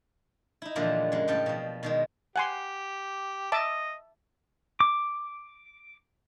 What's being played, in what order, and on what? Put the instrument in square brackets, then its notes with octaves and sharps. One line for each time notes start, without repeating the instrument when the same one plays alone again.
[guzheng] D#4 E4
A#2 D3 E3 F3 G3 G#3
F#2 G#3
A2 C#3 G3 G5 A5
B2 F3
B2 D#3 G#3
[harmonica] G4 [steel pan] F#5 G#5 C6
[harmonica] D#5 [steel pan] E5 A5 D6
[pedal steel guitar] D6